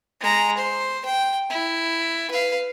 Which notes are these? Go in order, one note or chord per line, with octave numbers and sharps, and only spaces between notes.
G#3 A#5
C5
G5
E4
B4 F5